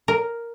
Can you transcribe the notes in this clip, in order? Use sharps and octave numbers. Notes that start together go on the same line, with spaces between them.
A#4